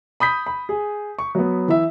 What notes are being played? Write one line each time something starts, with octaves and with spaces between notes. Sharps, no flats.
B5 D#6 G6 B6
B5
G#4
C#6
F#3 B3
E3 E4 E5